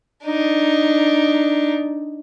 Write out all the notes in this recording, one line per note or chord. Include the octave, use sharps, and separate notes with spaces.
D4 D#4